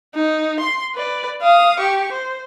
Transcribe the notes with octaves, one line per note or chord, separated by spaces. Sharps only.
D#4
C6
B4 D5
F5 D#6
G4 C#6
C5